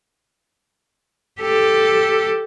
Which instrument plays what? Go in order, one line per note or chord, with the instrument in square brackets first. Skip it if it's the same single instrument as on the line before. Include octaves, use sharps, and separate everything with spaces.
[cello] G4 A4